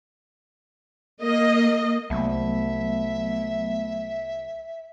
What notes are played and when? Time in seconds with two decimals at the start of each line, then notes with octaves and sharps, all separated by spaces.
1.21 A#3 D#5
2.10 C2 F#3 A3 B3 E5